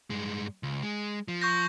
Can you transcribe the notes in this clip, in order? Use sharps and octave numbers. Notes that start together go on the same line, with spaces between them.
G2 G#3
C#2
G#3
F3
C#6 G6 A#6